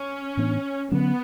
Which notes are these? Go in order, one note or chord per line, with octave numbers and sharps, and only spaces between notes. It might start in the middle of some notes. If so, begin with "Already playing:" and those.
Already playing: C#4
A2 E3 B3 D4
D3 F#3 B3 C#4